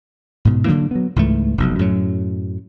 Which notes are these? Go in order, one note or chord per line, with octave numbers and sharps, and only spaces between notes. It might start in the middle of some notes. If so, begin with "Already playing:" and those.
G#2 B2
D3 E3 F#3 A#3
F#3 B3
C#2 G#2 E3 A3
F1 B1 G#2
F#2 A2 F#3